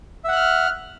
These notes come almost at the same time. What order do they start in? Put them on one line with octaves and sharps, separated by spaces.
E5 F#5 F#6 F6